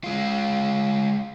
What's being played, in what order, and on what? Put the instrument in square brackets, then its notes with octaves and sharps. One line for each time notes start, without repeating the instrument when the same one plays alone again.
[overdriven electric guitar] G#3 F4